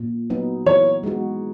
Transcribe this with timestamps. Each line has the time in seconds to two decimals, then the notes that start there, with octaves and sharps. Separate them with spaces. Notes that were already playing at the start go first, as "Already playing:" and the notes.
Already playing: A#2
0.30 F#3 B3 D#4
0.66 E3 C#5
1.03 G#3 B3 D#4 F#4